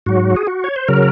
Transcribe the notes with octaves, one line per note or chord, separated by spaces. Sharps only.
G#2 F#3 F#4
G#4
F#4
C#5
C5
C#3 F#3 A#4